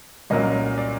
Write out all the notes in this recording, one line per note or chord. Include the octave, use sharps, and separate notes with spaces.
C2 A#2 F#3 A#3 C#4 D#5
D5